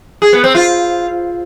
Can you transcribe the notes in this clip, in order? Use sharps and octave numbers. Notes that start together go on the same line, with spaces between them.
G#4
B3
C4
F4